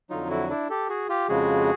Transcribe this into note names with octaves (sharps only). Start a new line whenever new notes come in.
F2 D3 F#3 D#4 F4
E4 F#4
D4 E4
G4 A4
F#4 G#4
F4 G4
F2 C#3 F3 G#3 F#4 G#4